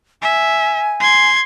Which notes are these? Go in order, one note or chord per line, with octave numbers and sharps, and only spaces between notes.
E5 G#5
C6 G#6